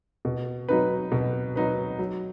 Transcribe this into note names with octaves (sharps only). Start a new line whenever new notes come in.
B2
F#3 D#4 B4
B2
F#3 D#4 B4
F#3